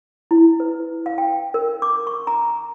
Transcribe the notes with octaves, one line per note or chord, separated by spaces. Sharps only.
E4
B4
F5
G5
A#4
D6
C#6
A#5